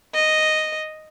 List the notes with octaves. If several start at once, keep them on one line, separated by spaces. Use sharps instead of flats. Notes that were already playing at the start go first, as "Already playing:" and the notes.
D#5